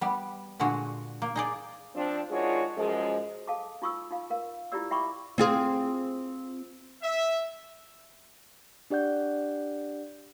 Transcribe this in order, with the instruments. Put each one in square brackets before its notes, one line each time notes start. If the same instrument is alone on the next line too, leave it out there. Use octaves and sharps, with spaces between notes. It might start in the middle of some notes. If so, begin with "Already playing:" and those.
[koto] G3 B3
A#2 D3 G#3 F#4
A#3
D#4 G#4 D5
[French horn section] F3 C4 D4
D#3 G#3 D4 F4 F#4 C#5
F#2 F3 G#3
[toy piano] A4 F5 A5 D6
D#4 F4 C#6 D#6 E6
D#4 F4 F5
A#4 F5
E4 F4 G4 D5 E6
D5 E5 G5 B5 C#6 D6
[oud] C4 F4 G#4
[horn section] E5
[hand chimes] D4 G4 D5 F#5 G6